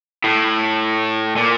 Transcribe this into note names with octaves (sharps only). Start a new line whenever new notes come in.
A2
A#2